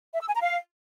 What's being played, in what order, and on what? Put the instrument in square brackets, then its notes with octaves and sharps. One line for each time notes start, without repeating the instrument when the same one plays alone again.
[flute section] E5
E6
G#5
A#5
F5